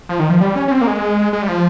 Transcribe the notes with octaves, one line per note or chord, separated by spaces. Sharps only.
F3
D#3
F3
G3
C#4
C#4
C4
A#3
G#3
G#3
G3
F3